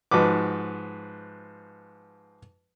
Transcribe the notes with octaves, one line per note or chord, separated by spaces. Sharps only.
G#2 F3 F#4 B4 D6